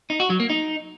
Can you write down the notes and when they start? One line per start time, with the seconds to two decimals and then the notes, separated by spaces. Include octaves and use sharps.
0.10 D#4
0.20 F#4
0.30 F#3
0.40 A#3
0.50 D#4